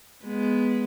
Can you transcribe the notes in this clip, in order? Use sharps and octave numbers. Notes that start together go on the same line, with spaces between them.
G#3 B3